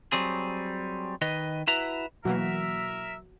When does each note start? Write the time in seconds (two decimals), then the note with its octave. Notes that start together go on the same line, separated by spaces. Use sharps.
0.12 F#3 G3 C4 G#4
1.22 D#3 B4 D#5
1.67 E4 F#4 B4 E5 A#5
2.25 B2 E3 F#3 A#3 F#4 A#4 E5